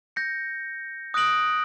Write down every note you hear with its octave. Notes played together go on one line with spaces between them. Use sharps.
G6 A#6 C#7
D#6 F#6 A#6 D7 F#7